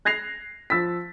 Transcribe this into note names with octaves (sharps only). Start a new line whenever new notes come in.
F#6 G#6 A#6 C7 F7
F3 E6 A6 B6